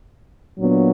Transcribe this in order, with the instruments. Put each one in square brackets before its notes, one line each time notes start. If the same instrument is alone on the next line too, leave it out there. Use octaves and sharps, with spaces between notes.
[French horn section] A#2 F#3 B3 D4